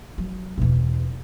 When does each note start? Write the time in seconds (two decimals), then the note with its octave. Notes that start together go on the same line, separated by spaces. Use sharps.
0.18 F#3
0.58 E2 B2